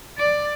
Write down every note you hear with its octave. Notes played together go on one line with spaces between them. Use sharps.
D5